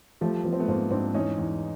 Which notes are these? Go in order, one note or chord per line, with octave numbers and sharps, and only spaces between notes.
F3 G3 A3
F3 B3
C4
A3 B3
G#2 A#3 C4
G#2 C4 D4
E2 C#4 D#4
E2